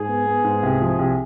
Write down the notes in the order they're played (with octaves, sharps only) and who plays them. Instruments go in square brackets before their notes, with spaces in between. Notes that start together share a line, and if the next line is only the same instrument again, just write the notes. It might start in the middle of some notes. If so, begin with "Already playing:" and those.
Already playing: [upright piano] G#2 [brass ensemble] G#4
[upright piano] B3
B3
G#2
C2
F3
C2